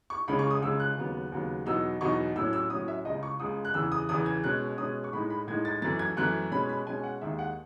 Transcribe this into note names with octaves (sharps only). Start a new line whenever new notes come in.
C#6
C#2 C#3 G#3 C#4 B5
C#6
D#6
C#2 C#3 G#3 C#4 E6
F#6
D#2 C#3 F#3 B3
D#2 C#3 F#3 B3
E2 B2 F#3 B3 D#4 E6
E2 B2 F#3 B3 D#4 C#6
A2 F#3 C#4 E6
E6
A2 F#3 C#4 D#6
E5
C#2 C#3 G#3 D#5
C#6
C#2 C#3 G#3 D#6
F#6
E2 C#3 E3 E6
D#6
E2 C#3 E3 D#6
G#6
B2 G#3 C#4 F#6
B2 G#3 C#4 D#6
C#6
A2 G#3 D#4 B5
B5
A2 G#3 D#4 G#6
A6
F#2 E3 A3 A6
G#6
F#2 E3 A3 F#6
B2 G#3 C#4 B5
B5
B2 G#3 C#4 G#5
F#5
D#2 D#3 G#3 E5
F#5